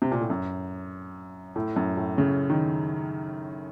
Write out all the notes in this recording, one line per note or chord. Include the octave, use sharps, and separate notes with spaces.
C3
A#2
A2
F#2
A2
F#2
A2
C#3
D#3